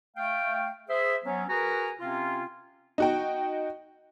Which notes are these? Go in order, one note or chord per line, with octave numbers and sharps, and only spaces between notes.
A3 F5 G5
G#4 C5 E5
F#3 B3 C#4
F#4 G#4 A#4 B4 G#5 A#5
C3 C4 C#4 F4
D#4 F#4 G5